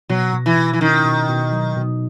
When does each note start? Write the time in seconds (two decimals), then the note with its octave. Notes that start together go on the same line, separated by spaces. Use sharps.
0.09 B2 F#3
0.33 B2
0.46 E3
0.58 B2
0.73 E3
0.81 D#3 C#4
1.05 B2
1.29 B2
1.53 F#3
1.76 B2